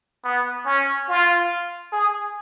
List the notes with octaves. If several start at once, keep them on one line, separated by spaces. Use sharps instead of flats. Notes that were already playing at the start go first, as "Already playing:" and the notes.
B3
C#4
F4
G#4